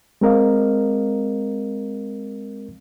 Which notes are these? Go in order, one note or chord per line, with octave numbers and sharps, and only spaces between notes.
G#3 C4 A#4 D#5 F5